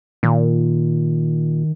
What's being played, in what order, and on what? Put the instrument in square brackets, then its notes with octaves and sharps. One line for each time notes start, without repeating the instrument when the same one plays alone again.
[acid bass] A#2 [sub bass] D#3